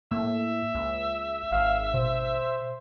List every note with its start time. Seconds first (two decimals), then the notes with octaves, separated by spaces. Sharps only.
0.12 A2 A#3 E5
0.75 C#2
1.52 G#1 F5
1.94 B2 C5